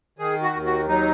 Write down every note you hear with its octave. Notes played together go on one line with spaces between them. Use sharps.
D#3 G#4
F#4
D#2
F#4
F#3 D#4